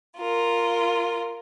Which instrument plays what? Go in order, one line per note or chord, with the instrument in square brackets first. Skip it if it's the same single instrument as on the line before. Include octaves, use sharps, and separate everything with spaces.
[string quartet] F4 A#4